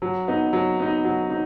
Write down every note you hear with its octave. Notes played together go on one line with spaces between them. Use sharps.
F#3
B3 D#4
F#3
B3 D#4
F#3
D#4